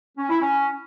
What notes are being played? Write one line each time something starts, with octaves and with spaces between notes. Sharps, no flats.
C#4
E4
C#4